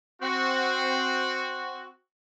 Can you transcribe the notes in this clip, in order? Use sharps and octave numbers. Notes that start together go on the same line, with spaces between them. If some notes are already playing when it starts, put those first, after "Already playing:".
C4 F#4